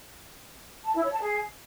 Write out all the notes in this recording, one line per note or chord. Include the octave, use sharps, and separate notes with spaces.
A5
E4
C#5
A5
G#4